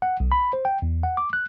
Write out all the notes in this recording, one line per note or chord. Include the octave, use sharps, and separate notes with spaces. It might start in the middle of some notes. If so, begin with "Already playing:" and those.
F#5
B1
B5
C5
G5
E2
F#5
D6
F#6